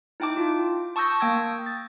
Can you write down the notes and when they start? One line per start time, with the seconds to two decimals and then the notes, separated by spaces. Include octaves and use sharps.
0.20 D#4 E4 G5 A5 D6
0.37 F4
0.96 A5 C#6 D#6 E6 G6 A#6
1.20 A#3 G5 D#6 E6 G#6 A#6
1.66 A6